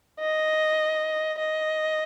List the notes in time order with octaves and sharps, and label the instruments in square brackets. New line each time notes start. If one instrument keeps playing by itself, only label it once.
[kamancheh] D#5
D#5